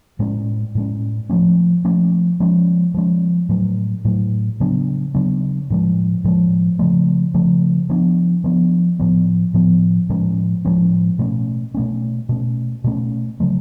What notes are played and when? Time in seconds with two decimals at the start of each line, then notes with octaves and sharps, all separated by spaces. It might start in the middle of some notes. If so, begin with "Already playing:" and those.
0.19 A2 G#3 C#4
0.75 A2 G#3 C#4
1.30 F3 A3 C#4
1.85 F3 A3 C#4
2.40 F3 G#3 C#4
2.94 F3 G#3 C#4
3.49 A2 F#3 A3
4.05 A2 F#3 A3
4.60 C#3 F#3 B3 D4
5.15 C#3 F#3 B3 D4
5.70 A2 F3 G#3
6.24 A2 F3 G#3
6.79 C#3 F3 A3
7.34 C#3 F3 A3
7.89 F3 B3 D4
8.44 F3 B3 D4
8.99 A2 F3 B3
9.54 A2 F3 B3
10.09 A2 F3 G#3 C#4
10.65 A2 F3 G#3 C#4
11.19 B2 A3 C#4
11.74 B2 A3 C#4
12.29 B2 A3 C#4
12.84 B2 A3 C#4
13.40 C#3 F#3 A3